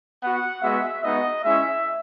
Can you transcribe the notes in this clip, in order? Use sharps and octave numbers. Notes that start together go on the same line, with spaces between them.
B3 F#4 F#5
G#3 B3 F#4 E5
G#3 B3 D#4 F#4 D#5
G#3 C#4 E4 E5